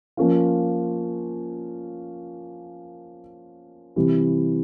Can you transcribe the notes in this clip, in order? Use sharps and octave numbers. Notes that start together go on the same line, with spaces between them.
F3 A#3 C#4 F4
C3 E3 G3